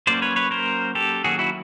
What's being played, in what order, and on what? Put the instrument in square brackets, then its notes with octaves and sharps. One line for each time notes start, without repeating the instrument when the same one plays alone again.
[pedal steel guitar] F#3 A#3 C#4 C5 D5
B4 C#5
B4 C#5
A#4 C5
G4 A4
D#3 F#3 A#3 C#4 F#4 G#4
E4 F#4